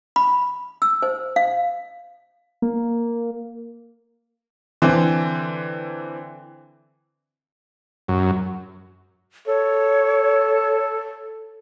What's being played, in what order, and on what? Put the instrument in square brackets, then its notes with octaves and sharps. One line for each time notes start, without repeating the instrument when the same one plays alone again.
[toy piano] B5
E6
C5
F5
[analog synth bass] A#3
[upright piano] D3 E3 C4
[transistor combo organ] F#2
[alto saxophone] A4 [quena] C#5